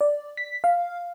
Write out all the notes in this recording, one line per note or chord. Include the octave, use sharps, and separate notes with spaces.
D5
B6
F5